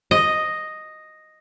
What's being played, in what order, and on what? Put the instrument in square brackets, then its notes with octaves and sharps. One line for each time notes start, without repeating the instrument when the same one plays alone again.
[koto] D#5